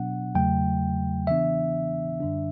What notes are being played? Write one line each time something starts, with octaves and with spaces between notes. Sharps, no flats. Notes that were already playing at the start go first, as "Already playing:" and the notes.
Already playing: B2 F#3 B3 D4 F#5
E2 C#3 F#3 A3 G5
C#3 E3 B3 D4 E5
F#2 D3 G3 D4